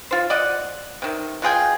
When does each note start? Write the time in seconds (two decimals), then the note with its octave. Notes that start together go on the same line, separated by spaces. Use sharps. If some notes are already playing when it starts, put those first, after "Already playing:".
0.11 F4 C5
0.30 D5 D#5 F#5
1.02 C3 D#3
1.42 B2 F4 G#4 G5